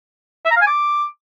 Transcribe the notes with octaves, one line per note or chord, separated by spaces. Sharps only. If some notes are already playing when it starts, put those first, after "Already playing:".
E5
A#5
F5
G#5
D6